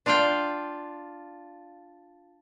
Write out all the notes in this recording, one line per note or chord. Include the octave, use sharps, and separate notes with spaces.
D4 F4 D5 F5 G5